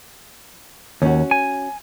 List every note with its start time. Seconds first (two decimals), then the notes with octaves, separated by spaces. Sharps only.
1.02 D#2 C#4 F#4
1.31 G#5